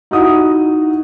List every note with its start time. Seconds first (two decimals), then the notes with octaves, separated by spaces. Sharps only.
0.11 D#4 E4 F#4 F#5 D#6